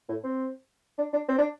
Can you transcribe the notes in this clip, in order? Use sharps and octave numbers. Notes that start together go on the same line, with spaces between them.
A2
C4
D4
D4
C4
D4